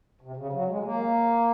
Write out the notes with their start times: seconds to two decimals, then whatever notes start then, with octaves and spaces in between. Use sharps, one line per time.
0.21 C3
0.36 C#3
0.53 F#3
0.68 G#3
0.84 A#3